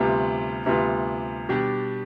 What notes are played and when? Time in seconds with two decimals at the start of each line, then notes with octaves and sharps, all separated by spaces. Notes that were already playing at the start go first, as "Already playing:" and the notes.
Already playing: D2 C3 G3 B3 F4
0.66 D2 C3 G3 B3 F4
1.49 B2 G3 D4 G4